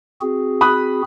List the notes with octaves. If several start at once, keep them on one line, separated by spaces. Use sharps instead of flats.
C4 F#4 G#4
B5 D#6 F#6